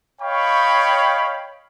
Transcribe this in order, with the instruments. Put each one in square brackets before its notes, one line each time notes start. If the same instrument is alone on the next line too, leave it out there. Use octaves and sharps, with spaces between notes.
[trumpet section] C#5 D#5 F5 G5 B5 C#6